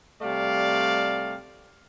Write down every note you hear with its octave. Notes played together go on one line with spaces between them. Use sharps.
C3 G3 A3 D5 F5